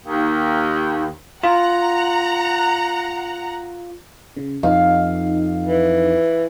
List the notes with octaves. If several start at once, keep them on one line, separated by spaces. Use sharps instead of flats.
D#2
F4 F#5 A#5
C#3
F2 D#4 F5
E3